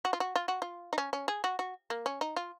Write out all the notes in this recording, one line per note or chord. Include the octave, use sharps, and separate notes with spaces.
F#4
F4
F#4
F4
F#4
F4
D#4
C#4
C#4
G#4
F#4
F#4
A#3
C#4
D#4
F4